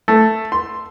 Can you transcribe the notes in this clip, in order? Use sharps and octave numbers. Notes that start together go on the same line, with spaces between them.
A3
C6